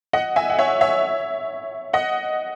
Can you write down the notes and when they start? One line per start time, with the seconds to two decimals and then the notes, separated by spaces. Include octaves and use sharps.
0.13 D#5 F#5
0.36 E5 G#5
0.50 F#5
0.59 C#5 E5
0.81 C#5 E5
1.93 D#5 F#5